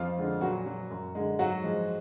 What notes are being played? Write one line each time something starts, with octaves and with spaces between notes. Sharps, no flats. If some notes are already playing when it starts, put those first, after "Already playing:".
Already playing: F2 F3 F4
D3 G#3
A#2 F#3 F#4
F#3
F#2
D3 G#3
G#2 F#3 F#4
F3 G#3